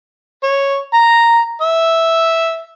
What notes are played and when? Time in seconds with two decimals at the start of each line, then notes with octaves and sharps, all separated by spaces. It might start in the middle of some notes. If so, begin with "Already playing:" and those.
0.43 C#5
0.94 A#5
1.61 E5